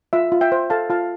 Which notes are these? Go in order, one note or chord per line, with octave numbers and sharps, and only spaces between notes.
F4 E5
F4
E5 G5
C5
A4 F5 A5
F4 F5 A5